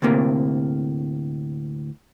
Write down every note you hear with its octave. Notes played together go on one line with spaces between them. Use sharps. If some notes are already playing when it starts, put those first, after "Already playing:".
D2 A2 C3 A#3